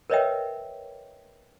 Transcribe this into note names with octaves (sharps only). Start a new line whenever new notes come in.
A#4 B4 C#5 D#5 E5 G5